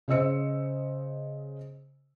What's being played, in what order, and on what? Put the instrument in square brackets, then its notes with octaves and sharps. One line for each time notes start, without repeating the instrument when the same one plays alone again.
[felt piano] C#3 C5 D#5 E6 C#7